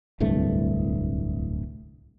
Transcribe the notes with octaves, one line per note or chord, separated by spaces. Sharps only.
D1 C2 G2 A3